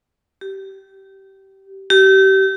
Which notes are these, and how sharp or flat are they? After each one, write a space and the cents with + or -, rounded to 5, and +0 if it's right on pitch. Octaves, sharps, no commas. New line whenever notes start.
G4 -20
G4 -30